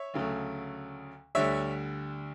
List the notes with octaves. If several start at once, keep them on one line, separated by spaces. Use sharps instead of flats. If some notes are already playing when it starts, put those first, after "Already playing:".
Already playing: C#5 E5
D2 C#3 F#3 A3
D2 D3 G3 C#5 E5